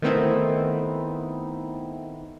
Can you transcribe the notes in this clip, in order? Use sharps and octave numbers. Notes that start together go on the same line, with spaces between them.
D#3 A3 B3 C4 D#4 E4